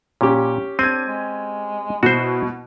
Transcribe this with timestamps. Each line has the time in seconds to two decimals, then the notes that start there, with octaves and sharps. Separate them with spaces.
0.21 A#2 C#4 G4
0.79 C4 D4 G#6 D#7
1.06 G#3
2.03 B2 E4 F#4 C5